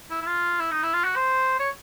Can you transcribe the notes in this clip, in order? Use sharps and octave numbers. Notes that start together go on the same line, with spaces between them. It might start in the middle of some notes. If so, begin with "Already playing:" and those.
E4
E4
F4
E4
D#4
E4
F4
F#4
C5
C#5